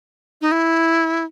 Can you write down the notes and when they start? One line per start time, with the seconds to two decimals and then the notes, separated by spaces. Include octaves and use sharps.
0.41 D#4
0.52 E4